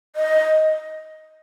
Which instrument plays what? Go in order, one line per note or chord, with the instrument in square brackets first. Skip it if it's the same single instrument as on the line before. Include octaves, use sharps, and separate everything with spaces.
[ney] D#5